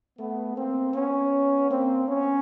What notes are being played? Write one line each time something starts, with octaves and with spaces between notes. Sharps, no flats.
A3 B3
A#3 C4
B3 C#4
A#3 C4
B3 C#4